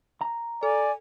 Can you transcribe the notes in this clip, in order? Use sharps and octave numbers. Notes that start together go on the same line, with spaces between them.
A#5
A4 D5 G#5